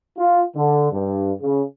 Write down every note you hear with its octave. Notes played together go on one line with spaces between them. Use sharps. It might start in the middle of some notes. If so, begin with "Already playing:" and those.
F4
D3
G2
C#3